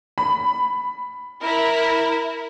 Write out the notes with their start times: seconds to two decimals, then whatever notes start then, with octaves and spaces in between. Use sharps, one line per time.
0.18 B5
1.43 E4 A#4